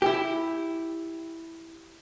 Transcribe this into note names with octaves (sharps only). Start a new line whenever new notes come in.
E4 G4